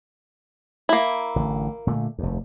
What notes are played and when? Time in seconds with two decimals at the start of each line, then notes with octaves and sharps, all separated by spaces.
0.89 A#3 E4
1.36 A1 D3
1.87 A#2 D3 A3
2.18 F1 D#2